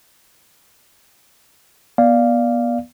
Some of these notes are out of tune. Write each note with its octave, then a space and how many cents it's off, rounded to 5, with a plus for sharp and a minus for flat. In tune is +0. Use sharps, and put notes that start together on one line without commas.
B3 -30 D5 +0 F5 -5